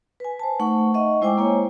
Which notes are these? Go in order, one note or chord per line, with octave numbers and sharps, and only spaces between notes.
B4 G#5
C5 A5
A3 D#4 F#5 C#6
D#5 E5 F#5 C#6
G#3 E4 C5 G5 G#5 D6
A#3 E4 C#5